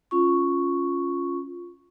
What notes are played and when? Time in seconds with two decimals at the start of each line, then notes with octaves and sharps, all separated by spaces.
0.11 C#4 F4 C#6